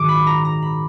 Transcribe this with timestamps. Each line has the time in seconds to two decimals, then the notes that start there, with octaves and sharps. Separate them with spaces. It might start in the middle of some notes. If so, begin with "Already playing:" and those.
Already playing: A#1 G#2 D#3 F#3 D6
0.08 B5
0.27 A#5
0.45 A#5
0.62 B5